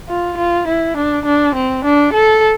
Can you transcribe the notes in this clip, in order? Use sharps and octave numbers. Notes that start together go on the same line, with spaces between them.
F4
F4
E4
D4
D4
C4
D4
A4